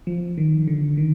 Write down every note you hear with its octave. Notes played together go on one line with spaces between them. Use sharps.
F3
D#3
D3
D#3